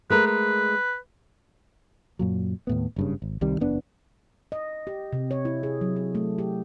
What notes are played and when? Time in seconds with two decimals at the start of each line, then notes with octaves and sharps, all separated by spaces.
0.10 G#3 A3 A#4 B4
0.26 B4
2.19 F#2 A#2 F#3
2.67 D#2 A2 B3
2.96 F#1 G2 C#3
3.22 G#1
3.41 C2 C3 D#3 G3
3.60 F#1 E2 B3 D4
4.52 D#5
4.87 G4
5.13 C3
5.31 C#5
5.45 E4
5.63 G#4
5.81 F#3
5.96 G#4
6.15 A3
6.38 G4